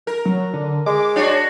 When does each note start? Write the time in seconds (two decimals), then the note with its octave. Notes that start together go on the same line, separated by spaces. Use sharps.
0.07 A#4
0.25 F#3
0.53 D3
0.86 G#3 D6
1.16 D4 F#4 C#5